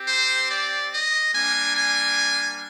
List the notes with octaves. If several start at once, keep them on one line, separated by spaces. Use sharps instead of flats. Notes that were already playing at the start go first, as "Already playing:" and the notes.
Already playing: C4 G4
C5
D5
D#5
G3 A#3 D4 G#5
G#5